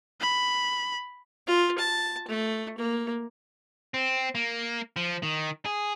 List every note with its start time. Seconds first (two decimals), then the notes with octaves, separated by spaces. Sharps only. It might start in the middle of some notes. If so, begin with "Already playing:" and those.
0.21 B5
1.48 F4
1.79 A5
2.28 A3
2.78 A#3
3.94 C4
4.35 A#3
4.96 F3
5.23 D#3
5.65 G#4